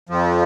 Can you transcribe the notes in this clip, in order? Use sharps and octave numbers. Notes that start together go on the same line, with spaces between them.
F2 F3